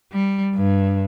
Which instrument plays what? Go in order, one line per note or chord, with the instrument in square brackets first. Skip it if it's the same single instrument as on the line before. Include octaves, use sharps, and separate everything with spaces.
[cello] G3
G2